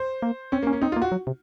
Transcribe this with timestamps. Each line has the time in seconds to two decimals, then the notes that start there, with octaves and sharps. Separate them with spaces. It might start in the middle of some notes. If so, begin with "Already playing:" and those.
Already playing: C5
0.22 A#3
0.52 C4 C#4
0.63 A#3 C#4
0.73 C#4
0.81 C4 D#4
0.92 A#3 F4
1.02 F#4
1.12 F#3
1.27 C3